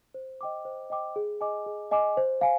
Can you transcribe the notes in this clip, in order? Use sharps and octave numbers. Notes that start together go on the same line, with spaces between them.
C5
D#5 G5 D6
C5
D#5 G5 D6
G#4
D#5 G#5 D6
G#4
D#5 G#5 D6
C5
F5 G#5